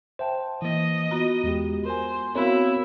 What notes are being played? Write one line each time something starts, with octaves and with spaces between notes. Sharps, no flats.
C5 E5 G5 A5
E3 A#3 D#5
B3 F4 F#4 A#5
E2 G#3 G4
A#4 C5 G#5
B3 C4 E4 F#4 A#4 C#5 F5